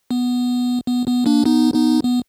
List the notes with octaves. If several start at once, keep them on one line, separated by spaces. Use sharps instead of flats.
B3
B3
B3
A#3 D4
B3 D#4
B3 D#4
B3